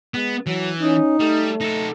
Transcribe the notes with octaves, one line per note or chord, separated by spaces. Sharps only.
G#3 B3
E3 F#3
C#4 D#4
G3 A3
D#4 A4